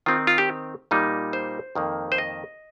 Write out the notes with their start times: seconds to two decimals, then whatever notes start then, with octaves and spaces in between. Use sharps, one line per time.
0.06 D#3 C4 D#4 F4
0.27 F4
0.38 G4
0.91 A#2 G3 A#3 D#4
1.33 C5
1.75 F2 D#3 A#3
2.12 C5
2.18 D#5